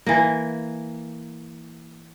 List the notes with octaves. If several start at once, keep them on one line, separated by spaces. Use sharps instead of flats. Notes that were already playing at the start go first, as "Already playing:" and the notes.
E3 A#3